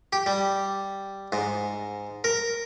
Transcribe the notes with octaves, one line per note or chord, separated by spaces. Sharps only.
G4
G3
G#2
A#4